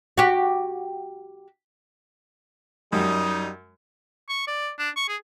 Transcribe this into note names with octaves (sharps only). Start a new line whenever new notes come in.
F#4 G4
F#2 G3 D#4
C#6
D5
D4
C#6
G#4